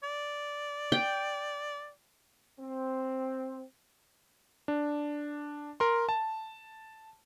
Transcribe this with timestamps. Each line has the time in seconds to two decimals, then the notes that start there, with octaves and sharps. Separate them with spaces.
0.03 D5
0.92 G5
2.59 C4
4.68 D4
5.80 A#4 C6
6.09 A5